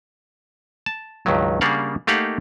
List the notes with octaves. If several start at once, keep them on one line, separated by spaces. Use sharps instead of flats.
A5
C#2 G2 D#3 F#3
C#3 G3 A#3 D4 F5 F#5
A3 A#3 D#4 G4 F5 F#5